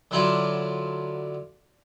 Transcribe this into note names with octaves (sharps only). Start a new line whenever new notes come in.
D3 F#3 D4 E4 F4